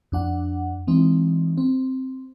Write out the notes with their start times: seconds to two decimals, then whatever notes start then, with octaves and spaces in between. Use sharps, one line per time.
0.12 F2 D4 F#5
0.87 E3 G#3 C4 D#4
1.58 C4